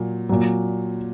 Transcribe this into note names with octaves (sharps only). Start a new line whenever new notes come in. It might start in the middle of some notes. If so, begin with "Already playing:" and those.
Already playing: A#2 F#3
A#2 F#3